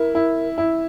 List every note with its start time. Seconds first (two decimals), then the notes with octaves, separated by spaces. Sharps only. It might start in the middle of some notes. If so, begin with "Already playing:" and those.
Already playing: E4 A#4
0.15 E4
0.58 E4